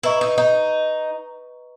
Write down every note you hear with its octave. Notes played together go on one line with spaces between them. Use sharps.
E4 B4 D#5 A#5 C#6
D#4
D#4